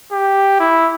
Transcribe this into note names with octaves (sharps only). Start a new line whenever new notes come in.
G4
E4